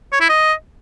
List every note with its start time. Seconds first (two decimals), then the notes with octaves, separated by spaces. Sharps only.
0.13 C#5
0.21 E4
0.29 D#5